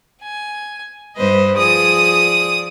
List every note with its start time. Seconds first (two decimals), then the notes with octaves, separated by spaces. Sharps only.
0.23 G#5
1.17 G2 G3 B4 C5 D#5
1.57 F3 G#4 D5 D#6